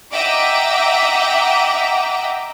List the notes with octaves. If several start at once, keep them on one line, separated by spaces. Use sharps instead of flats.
D#5 E5 F#5 G5 A#5 D6